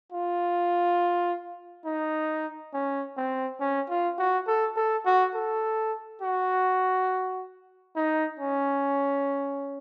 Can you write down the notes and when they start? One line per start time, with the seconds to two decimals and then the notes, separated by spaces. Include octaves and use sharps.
0.12 F4
1.85 D#4
2.74 C#4
3.17 C4
3.60 C#4
3.89 F4
4.18 F#4
4.47 A4
4.76 A4
5.06 F#4
5.35 A4
6.21 F#4
7.96 D#4
8.40 C#4